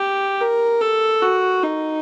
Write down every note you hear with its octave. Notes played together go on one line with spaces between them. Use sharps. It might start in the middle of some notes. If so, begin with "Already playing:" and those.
Already playing: G4
A#4
A4
F#4
D#4